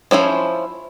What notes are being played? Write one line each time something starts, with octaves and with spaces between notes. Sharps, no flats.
F3 C#4 E4 C5